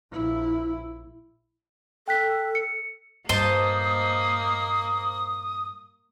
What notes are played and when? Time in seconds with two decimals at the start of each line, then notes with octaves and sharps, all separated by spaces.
0.12 A#1 E4
2.08 A4 G5 F#6 B6
2.55 C#7
3.29 G2 A#2 A#3 C5 D#5 A5 D#6